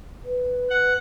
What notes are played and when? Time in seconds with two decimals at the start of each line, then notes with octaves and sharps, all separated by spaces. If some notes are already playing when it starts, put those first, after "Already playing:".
0.25 B4
0.70 F#5